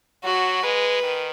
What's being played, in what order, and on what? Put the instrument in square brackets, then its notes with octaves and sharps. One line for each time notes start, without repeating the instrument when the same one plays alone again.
[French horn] F#3 [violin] F#4
[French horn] G#3 [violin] B4
[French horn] D#3